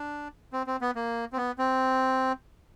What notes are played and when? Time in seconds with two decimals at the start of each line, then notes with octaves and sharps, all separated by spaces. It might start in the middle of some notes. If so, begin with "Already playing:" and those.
Already playing: D4
0.53 C4
0.67 C4
0.81 B3
0.95 A#3
1.33 C4
1.37 B3
1.58 C4